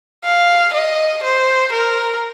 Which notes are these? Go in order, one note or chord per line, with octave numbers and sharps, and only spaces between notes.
F5
D#5
C5
A#4